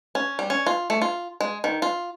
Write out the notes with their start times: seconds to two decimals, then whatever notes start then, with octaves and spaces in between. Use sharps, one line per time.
0.15 C#4
0.39 G3
0.50 C#4
0.67 F4
0.90 A3
1.02 F4
1.41 G#3
1.64 D#3
1.82 F4